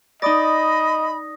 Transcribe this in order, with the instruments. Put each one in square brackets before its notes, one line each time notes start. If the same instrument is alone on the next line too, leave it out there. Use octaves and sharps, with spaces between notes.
[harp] D#4 D5 [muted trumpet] D#5 [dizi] B5 [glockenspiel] D#6 A#6